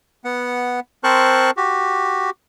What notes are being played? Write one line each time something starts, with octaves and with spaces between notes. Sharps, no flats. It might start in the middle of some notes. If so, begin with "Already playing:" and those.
B3 F#5
C4 A#4 C5 A5 C#6 F#6
F#4 G4